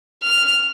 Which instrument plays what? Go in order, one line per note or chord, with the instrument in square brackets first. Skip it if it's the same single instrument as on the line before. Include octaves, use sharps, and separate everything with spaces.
[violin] F6